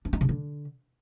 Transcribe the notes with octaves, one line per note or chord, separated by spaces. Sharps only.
D4
D#4
C#3
D3